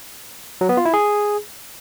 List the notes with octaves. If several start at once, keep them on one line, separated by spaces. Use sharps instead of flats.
F#3
B3
F4
E4
G#4